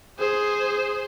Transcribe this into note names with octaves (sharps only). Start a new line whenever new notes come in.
G#4 C5